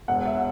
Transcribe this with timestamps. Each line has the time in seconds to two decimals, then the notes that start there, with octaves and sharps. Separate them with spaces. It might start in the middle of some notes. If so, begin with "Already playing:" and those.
0.08 E1 F#5
0.26 E5